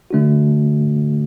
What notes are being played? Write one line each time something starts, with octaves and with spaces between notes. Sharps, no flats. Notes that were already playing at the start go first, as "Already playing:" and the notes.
D3 A3 D4 F#4